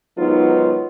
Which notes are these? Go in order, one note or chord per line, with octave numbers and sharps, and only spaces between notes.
G#2 D#3 F#3 B3 D#4 F4